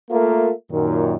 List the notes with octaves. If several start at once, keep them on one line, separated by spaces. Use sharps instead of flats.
A3 A#3 F4 A4 A#4 E5
F#2 A#2 D#3